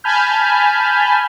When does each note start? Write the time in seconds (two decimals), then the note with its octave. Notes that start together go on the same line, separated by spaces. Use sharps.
0.04 G#5 A5 B5 F6 G6